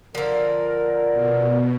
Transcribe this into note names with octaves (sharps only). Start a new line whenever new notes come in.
D3 F3 A#4
B2